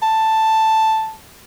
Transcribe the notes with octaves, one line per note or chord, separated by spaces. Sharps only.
A5